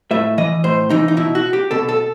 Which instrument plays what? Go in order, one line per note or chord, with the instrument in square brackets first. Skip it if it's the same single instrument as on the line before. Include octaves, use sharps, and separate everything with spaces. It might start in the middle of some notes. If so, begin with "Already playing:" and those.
[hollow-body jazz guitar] A2 E5
E3 D#5
A2 C5
E3 D#4
D#4
B2 E4
F#4
G4
B2 A4
A4